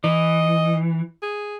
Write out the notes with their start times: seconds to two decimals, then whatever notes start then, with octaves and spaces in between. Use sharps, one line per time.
0.04 E3 D#5
1.22 G#4